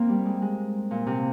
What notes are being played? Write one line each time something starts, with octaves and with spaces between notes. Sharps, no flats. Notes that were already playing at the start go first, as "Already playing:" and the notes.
Already playing: A#3 C4
G3
G#3
G#3
A#2
C3